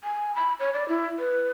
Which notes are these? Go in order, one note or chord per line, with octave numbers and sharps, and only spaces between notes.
G#5
B5
C#5
D5
E4
B4